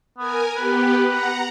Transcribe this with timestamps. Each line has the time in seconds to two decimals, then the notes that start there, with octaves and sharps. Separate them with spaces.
0.18 B3 A#4 G#5
0.56 B3 G4 B4
1.05 F#5 A#5